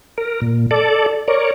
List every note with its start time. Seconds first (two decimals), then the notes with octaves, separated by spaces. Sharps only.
0.18 A#4
0.42 A#2
0.71 A4 D5
1.28 A#4 C#5 D5